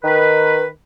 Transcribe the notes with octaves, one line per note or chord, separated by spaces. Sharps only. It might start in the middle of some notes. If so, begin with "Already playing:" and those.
D#3 B4